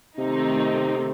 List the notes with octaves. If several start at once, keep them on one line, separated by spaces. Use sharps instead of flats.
C3 D#3 A3 C4 D#4